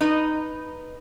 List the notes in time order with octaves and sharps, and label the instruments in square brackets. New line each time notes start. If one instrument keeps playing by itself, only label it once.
[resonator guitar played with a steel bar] D#4 B4